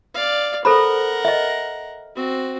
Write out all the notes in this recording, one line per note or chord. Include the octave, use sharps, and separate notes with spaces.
D5 F5
A4 A#4 C5 F#5 B5
D#5 E5
C4 F#4